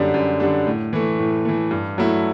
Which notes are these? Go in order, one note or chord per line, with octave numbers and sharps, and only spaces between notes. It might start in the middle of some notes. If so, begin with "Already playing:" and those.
Already playing: F#2 D3 G3 D4
F#2
D3 G3 D4
A2
E3 A3
A2
E3 A3
G2
F#3 A3 E4